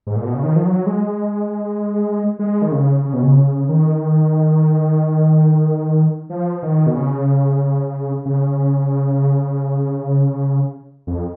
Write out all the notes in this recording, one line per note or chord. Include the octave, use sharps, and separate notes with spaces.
G#2
A#2
B2
C#3
D#3
F3
F#3
G#3
G#3
D#3
C#3
C#3
B2
C#3
D#3
F3
D#3
B2
C#3
C#3
F2